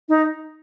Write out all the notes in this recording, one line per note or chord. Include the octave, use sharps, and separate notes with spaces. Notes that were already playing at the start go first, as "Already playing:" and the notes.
D#4